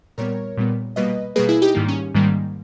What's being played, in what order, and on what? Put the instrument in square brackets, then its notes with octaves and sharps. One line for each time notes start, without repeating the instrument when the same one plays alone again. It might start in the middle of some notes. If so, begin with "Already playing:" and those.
[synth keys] A#2 G3 B3 A#4 C#5
A#2 G3 B3
B2 G3 A#3 B4 D#5
B2 G3 A#3 G#4 B4
E4 G#4
D#4 G4
G#2 D#3 G3 A#3
C#4
G#2 D#3 G3 A#3